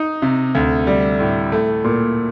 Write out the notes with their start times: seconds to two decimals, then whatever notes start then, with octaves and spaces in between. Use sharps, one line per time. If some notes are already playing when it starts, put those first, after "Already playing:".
Already playing: D#4
0.22 C3
0.55 D2
0.87 G3
1.20 A2
1.52 A3
1.84 A#2